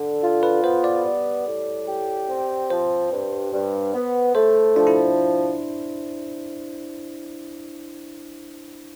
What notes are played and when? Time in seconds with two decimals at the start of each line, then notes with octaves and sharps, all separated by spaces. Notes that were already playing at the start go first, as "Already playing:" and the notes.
Already playing: D3 A4
0.22 F4
0.43 B4
0.64 B3 C5
0.84 D5
1.06 G3
1.46 A2
1.88 G4
2.29 C4
2.70 F3 C5
3.12 G2
3.52 G2
3.94 B3
4.35 A3 C5
4.76 F3 D4
4.87 E4